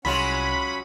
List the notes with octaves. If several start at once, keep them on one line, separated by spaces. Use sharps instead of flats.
C2 F#3 G#3 C#4 F4 F#5 B5